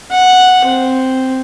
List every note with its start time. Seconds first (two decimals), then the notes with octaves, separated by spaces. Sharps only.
0.11 F#5
0.65 C4